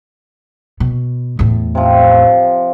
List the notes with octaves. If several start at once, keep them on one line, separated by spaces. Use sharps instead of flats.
B2
E2 A2
C3 F3